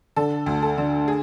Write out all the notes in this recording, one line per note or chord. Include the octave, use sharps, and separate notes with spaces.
D3 A4
D2
A4
D3
G#4